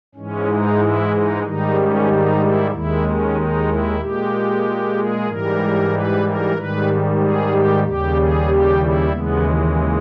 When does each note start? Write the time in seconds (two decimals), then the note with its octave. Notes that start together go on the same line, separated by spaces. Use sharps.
0.15 G#2 E3 G#3 C#4
0.47 D#4
0.79 E4
1.12 D#4
1.43 G#2 D#3 G3 D#4
1.75 C#4
2.08 D#4
2.39 E4
2.71 D#2 D#3 G#3 E4
3.03 C#4
3.35 D#4
3.68 E4
3.99 A#2 G#3 G4
4.95 G#4
5.27 G#2 E3 G3 A#4
5.92 B4
6.24 A#4
6.56 G#2 D#3 G3 B4
7.20 G#4
7.52 G4
7.84 D#2 C#3 G3 G4
8.16 G#4
8.48 G4
8.79 E4
9.12 D#2 C#3 E3 G#3 B3